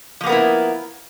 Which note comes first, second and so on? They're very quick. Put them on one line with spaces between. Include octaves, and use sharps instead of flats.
F3 A#3 B3 A#4 E4